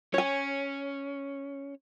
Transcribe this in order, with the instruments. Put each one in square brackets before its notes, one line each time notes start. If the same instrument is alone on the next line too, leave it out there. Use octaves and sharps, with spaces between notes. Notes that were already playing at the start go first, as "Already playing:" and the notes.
[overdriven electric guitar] C#4 [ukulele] C#5 G#5